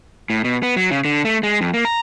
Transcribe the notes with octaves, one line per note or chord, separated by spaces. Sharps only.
A2
B2
B3
F#3
C#3
D3
A3
G#3
F2
A#3
A#5